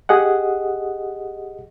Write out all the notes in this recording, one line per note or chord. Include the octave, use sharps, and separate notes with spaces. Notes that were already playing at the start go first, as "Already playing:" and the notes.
G4 G#4 D#5 F#5